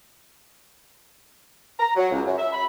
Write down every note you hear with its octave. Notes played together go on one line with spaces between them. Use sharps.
A#5
F#3
C#2
F#2
E5
B5